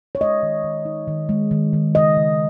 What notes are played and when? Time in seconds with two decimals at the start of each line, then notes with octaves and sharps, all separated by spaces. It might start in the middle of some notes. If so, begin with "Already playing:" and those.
0.15 C#5
0.21 G#3 D#5
0.43 D#3
0.64 D#3
0.85 D#4
1.08 D#3
1.29 G#3
1.51 D#3
1.73 D#3
1.94 C#3 D#5
2.16 C#3